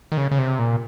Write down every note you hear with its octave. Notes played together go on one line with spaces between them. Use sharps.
D#3
C#3
C#3
C3
A#2